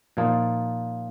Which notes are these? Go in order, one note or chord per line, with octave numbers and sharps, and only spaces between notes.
A#2 F3 A#3 D#4